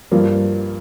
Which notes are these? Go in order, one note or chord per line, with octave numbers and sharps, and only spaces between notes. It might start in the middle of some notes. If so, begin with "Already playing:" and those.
G2 F3 A#3